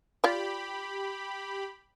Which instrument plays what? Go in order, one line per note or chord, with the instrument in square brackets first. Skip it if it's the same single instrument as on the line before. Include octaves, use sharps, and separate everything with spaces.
[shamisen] F4 D5 [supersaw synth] G4 B5